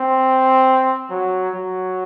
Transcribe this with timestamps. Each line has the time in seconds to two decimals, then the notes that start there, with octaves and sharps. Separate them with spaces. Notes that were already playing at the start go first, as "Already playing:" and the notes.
Already playing: C4
1.10 F#3
1.54 F#3